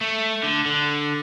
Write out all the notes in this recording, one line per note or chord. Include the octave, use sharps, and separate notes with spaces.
A3
D3
D3